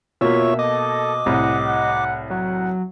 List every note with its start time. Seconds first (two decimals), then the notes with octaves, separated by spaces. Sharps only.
0.21 B2 A#3 F4 C#5 E5 C#6
0.59 A4 D#5 D6
1.26 C2 A2 F#5
1.66 F#5
2.30 F#3 F#5